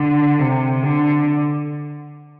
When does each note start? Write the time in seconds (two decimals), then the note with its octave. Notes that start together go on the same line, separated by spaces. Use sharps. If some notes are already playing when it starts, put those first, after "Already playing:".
Already playing: D3
0.40 C3
0.83 D3